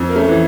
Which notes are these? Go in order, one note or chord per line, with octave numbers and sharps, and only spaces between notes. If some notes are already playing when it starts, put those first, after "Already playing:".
Already playing: F2
A#3
A3 C#4
E3